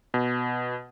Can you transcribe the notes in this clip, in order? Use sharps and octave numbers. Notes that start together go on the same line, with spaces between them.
B2